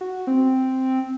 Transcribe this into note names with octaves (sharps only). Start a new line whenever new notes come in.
F#4
C4